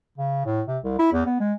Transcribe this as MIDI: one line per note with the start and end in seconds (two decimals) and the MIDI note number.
0.18 0.44 49
0.46 0.61 45
0.68 0.78 48
0.84 0.94 36
0.99 1.09 64
1.12 1.24 40
1.26 1.37 59
1.40 1.53 56